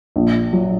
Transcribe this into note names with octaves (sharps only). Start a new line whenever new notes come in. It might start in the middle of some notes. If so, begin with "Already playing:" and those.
A#1
F#3